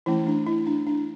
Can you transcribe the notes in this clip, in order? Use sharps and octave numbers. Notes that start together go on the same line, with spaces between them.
E3 A3 C#4 E4
D4
E4
D4
D4